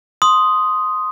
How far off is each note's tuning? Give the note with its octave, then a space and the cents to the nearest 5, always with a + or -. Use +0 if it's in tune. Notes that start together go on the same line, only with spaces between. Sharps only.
C6 +0 D#6 +0